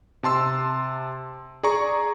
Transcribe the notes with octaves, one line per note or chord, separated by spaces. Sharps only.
C3 A5 C6 E6
G#4 D5 A#5 C#6